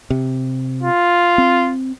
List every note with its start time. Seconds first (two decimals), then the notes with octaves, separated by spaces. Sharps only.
0.10 C3
0.82 F4
1.38 C4